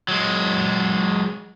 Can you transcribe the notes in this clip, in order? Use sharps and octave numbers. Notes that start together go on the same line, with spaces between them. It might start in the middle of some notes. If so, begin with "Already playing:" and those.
F#3 G#3